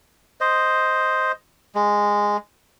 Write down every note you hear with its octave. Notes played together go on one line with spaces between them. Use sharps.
C5 D#5
G#3